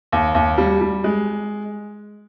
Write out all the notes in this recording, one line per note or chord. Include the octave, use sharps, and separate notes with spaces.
D#2
D#2
G3
G3
G#3